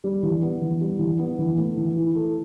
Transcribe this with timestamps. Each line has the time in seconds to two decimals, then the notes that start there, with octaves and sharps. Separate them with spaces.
0.04 G3
0.23 E3
0.42 B3
0.62 E3
0.81 G3
0.99 E3
1.19 B3
1.39 E3
1.57 A3
1.77 E3
1.96 E4
2.15 A4